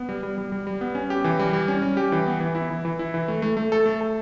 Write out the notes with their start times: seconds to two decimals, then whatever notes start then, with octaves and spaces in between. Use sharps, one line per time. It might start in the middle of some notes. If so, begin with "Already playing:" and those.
Already playing: B3
0.09 G3
0.23 G3
0.38 G3
0.52 G3
0.67 G3
0.81 B3
0.95 C#4
1.10 G4
1.24 E3
1.39 G3
1.53 G3
1.68 C#4
1.82 G3
1.97 G4
2.12 E3
2.27 B3
2.40 E3
2.55 E4
2.70 E3
2.85 E3
2.99 E4
3.14 E3
3.28 A3
3.42 A3
3.57 A3
3.72 A4
3.85 A3
4.01 A4